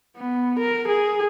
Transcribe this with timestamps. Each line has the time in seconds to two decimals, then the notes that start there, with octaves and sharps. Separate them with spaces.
0.17 B3
0.59 A#4
0.88 G#4